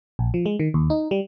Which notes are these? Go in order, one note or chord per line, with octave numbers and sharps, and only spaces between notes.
A#1
F3
G#3
D#3
D#2
D#4
G3